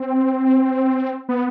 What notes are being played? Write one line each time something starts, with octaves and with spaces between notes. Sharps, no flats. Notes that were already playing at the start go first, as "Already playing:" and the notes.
Already playing: C4
B3